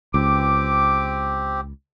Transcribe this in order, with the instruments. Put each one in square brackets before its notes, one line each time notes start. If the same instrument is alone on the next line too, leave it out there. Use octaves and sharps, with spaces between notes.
[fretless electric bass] C#2 [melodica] C4 G4 [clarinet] D6